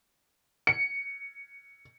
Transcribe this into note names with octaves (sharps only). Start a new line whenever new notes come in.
C#7